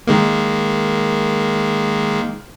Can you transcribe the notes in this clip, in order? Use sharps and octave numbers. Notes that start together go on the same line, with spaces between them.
D#3 G#3 A#3